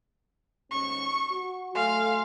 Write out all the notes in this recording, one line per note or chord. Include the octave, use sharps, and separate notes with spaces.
D#2 G#2 C#4 C#6
F#4
F#3 A3 A4 F5 G#5 C6